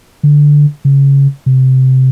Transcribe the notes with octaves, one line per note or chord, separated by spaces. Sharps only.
D3
C#3
C3